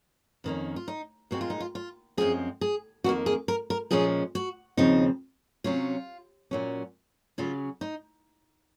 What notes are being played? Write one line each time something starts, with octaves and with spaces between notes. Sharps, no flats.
F2 D#3 A#3 C#4
F4
D#4
A#2 G#3 C4 F#4
F4
D#4
F4
F4
F#2 F3 G#3 C4 G#4
G#4
F2 D#3 A#3 F#4
G#4
A#4
A#4
A#2 F3 G#3 C#4 G#4
F#4
D#2 C#3 F3 C4 D#4
C3 F#3 C#4 F4
A#2 F#3 C#4
C#3 F#3 C#4 F4
D#4